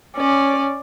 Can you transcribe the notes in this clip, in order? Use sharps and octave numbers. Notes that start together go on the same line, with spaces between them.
C#4 D5